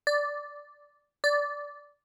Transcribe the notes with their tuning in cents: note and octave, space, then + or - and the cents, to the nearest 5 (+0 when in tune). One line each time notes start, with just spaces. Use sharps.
D5 -10
D5 -15